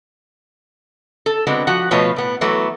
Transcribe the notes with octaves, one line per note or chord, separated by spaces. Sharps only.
A4
D3 G#3 B3 C4 F#4
F3 F#4 F#5
B2 F3 A3 F4 B4 C#5
A2 B3
E3 F#3 A3 B3